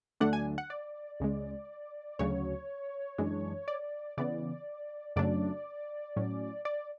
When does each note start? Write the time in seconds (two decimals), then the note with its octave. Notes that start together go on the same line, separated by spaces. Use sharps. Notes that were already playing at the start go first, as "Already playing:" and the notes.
0.21 D2 D3 F#3 A3 D4 F#5
0.33 G#5
0.58 F#5
0.70 D5
1.20 C#2 C#3 G#3
2.19 D2 C#3 F#3 C#5
3.18 F#2 E3 G#3 D4
3.68 D5
4.17 C#3 E3 B3 D5
5.16 F#2 C#3 F#3 A3 D4 D5
6.16 A2 F#3 C#4
6.65 D5